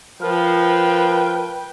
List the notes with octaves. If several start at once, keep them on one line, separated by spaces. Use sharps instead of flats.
F3 A#4 B4 G5